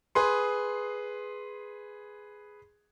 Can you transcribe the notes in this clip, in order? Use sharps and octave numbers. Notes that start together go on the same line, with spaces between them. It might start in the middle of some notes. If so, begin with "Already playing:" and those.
G#4 B4 C6